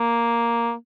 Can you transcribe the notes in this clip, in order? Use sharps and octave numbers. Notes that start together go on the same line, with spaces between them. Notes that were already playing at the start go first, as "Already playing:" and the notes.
Already playing: A#3